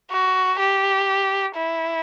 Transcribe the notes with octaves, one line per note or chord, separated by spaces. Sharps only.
F#4
G4
E4